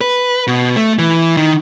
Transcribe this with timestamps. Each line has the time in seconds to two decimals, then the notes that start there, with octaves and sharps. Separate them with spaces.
0.01 B4
0.47 B2
0.76 A3
0.99 E3
1.37 D#3